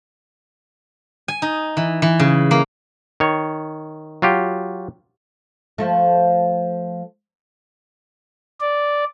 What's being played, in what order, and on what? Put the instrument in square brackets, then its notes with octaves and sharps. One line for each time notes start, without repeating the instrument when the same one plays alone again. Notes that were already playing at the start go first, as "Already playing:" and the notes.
[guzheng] G#5
D#4
E3
E3
C#3
A#3
[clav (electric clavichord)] D#3 C#5
F#3 F4 G4
[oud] F3 A3
[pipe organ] D5